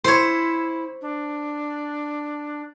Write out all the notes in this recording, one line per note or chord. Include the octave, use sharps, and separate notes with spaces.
E4 C5 C#5
D4